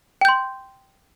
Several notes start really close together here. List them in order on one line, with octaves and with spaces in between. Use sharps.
G5 G6 C6